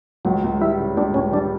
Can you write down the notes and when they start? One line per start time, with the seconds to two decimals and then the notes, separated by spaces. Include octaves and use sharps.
0.25 C#2 F#3
0.44 C#2
0.61 G3 E4
0.79 C#3
0.97 C#2 D4
1.14 C#2 C#4
1.32 G3 D4